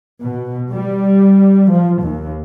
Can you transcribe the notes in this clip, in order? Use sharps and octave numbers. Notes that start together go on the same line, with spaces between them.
B2
G3
F3
D#2